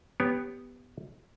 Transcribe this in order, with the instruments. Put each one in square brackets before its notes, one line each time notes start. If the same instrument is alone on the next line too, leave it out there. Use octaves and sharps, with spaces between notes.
[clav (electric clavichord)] B3 G4 C#5